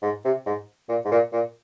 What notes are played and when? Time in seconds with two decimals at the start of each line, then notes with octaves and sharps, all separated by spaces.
0.03 G#2
0.25 C3
0.46 G#2
0.89 A#2
1.05 G#2
1.11 A#2
1.33 A#2